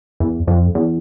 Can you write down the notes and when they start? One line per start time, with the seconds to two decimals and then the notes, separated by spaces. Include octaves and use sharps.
0.20 E2
0.47 F2
0.75 E2